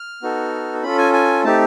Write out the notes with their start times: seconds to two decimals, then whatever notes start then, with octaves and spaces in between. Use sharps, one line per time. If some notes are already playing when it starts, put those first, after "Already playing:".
Already playing: F6
0.22 B3 D#4 F#4 A4
0.83 C#4 F4 A4 B5
0.98 G#5
1.13 G#5
1.44 A3 C4 D#4 G4 A5